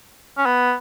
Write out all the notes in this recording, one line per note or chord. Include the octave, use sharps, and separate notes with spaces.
C#4
B3